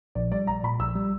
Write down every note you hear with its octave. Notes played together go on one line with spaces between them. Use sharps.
A#1 D5
G3 D5
A#1 A#5
A#2 B5
A#1 E6
G3